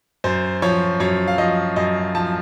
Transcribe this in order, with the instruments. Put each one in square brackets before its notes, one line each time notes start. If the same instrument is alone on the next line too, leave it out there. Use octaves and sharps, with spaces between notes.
[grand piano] F#2 C5
F3 C#5
F#2 C#5
F5
F3 D#5
F#2 D#5
F3 A5